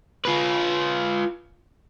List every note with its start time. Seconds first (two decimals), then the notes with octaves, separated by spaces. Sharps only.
0.25 F4 B4